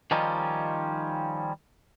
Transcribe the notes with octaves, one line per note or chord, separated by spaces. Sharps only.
D#3 F3 G3 C#4 D#4 F4